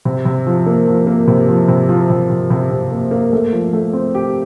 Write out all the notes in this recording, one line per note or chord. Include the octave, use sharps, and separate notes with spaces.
C3
C3
F3
A#3
F3
A#3
C3
F3
C3
F3
C3
C3
C3
C3
A#3
A#3
A3
F3
A3
C4
G4